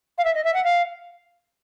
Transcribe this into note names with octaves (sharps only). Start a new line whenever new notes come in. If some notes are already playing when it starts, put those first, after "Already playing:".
F5
E5
D#5
E5
F#5
F5